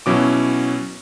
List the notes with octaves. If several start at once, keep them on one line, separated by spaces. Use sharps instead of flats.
B2 F#3 C#4 E4 D6